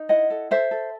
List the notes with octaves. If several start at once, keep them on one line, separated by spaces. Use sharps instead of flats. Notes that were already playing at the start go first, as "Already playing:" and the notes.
Already playing: D#4
E4 D#5 F#5
A4
A4 C5 E5
A4